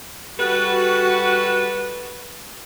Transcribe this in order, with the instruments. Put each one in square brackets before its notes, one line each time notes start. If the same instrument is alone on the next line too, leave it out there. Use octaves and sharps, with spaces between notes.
[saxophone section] G3 A4 B4 [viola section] F#4